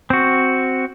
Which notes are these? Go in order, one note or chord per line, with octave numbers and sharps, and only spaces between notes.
C4 F#4